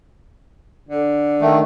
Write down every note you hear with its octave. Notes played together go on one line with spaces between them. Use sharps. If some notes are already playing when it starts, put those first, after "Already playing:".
D3
D#3 A3